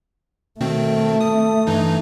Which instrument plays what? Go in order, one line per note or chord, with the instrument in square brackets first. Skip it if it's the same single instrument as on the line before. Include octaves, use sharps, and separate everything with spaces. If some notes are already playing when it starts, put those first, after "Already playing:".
[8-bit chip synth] B2 D#3 C4 [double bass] A3
[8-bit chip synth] D#6
G2 E3 D#4